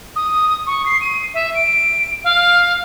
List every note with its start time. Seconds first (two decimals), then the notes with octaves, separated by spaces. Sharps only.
0.16 D#6
0.66 C#6
0.85 C7
1.01 D#7
1.34 E5
1.54 D7
2.24 F5